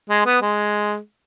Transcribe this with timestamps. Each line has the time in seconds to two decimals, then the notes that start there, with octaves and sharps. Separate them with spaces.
0.09 G#3
0.26 B3
0.41 G#3